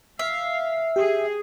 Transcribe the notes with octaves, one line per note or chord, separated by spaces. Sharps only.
E5 F5
G4 G#4